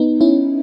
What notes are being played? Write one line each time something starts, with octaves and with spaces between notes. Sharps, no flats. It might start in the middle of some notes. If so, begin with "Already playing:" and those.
Already playing: B3 D#4
C#4 E4